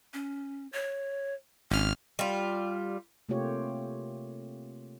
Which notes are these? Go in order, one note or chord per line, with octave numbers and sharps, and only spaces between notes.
C#4
C#5
G#1 C#4 F6
G3 F4
C3 A3 A#3 F4 G4 C#5